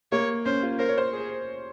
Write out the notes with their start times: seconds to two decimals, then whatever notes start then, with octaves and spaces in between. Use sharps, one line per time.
0.12 A#3 C#5
0.46 C#4 C5
0.63 F4
0.79 A#4 C5
0.89 C#5
0.98 C5
1.13 G#4